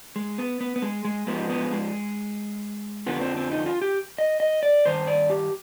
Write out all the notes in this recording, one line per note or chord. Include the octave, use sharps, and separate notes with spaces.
G#3
B3
B3
B3
G#3
G#3
G#2 F3 G#3 B3
B3
G#3
F2 D3 F3 B3
C4
C4
D#4
F4
G4
D#5
D#5
D5
G2 D#3 C5
D5
G4